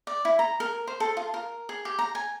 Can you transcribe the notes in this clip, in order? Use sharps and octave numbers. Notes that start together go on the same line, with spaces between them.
D5
E4
A#5
A#4
C5
A4
F4
A#4
G#4
G4
A#5
G#5